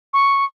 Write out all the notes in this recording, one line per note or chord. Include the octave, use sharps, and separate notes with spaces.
C#6